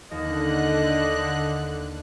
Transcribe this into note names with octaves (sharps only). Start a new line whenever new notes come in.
D#2 D3 D#5 F#6